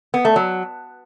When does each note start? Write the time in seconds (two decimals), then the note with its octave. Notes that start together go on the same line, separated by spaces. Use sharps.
0.14 B3
0.25 A3
0.36 F#3